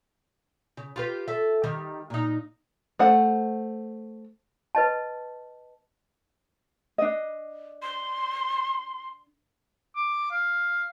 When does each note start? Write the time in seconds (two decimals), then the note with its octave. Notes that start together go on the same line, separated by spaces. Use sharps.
0.77 C#3
0.96 F4 G4 B4
1.28 A4 E5
1.64 D#3 G3
2.10 A#2 D#4
2.99 A3 C5 F#5
4.75 B4 D#5 A5
6.98 D4 D#5
7.82 C6
9.96 D6
10.31 F5